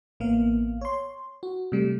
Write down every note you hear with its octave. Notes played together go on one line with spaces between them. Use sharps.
A1 A#3 B3 F5
C#5 C6
F#4
C3 G3 A3